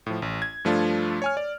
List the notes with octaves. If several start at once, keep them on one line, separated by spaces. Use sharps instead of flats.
A2 F3
A1
G#6
G2 F3 A3 D4 F4
C#5 G#5 F6
D5